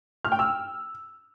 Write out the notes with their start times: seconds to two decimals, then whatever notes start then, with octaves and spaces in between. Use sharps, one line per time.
0.25 F6
0.32 G5
0.39 E6